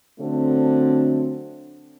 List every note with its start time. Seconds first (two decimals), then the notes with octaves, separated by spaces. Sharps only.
0.20 D3 F#3 A3 C4